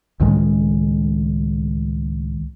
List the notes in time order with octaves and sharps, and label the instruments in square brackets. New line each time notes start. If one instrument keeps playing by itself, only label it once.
[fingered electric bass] C#2 A2 D#3 G#3